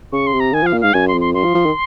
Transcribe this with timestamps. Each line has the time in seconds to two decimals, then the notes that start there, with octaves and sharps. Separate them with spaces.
0.12 C#3 C#6
0.27 C6
0.33 C3
0.40 A#5
0.53 D#3 G#5
0.63 F3 F5
0.73 A#2
0.81 G#2 F5
0.94 F#2 G#5
1.08 C6
1.14 F2
1.21 C6
1.34 F#2 C6
1.44 F3
1.55 F3
1.66 D#3